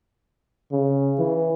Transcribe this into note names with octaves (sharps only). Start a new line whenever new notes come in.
C#3
E3